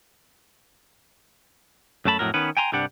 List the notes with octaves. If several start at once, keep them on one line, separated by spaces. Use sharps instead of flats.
F#2 F#3 A3 A5 B5
F2 A2 F#3 A#4
D#3 B3 C#4 B4
G5 G#5 A#5 C6
C2 G2 G3 D4 G4 F#5